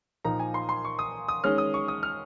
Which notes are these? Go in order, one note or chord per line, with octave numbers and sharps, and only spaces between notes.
A#2 F3 A#3 D#4 A#5
G#5
C6
C6
C#6
D#6
D#6
D#3 G#3 C#4 F6
D#6
C#6
D#6
F6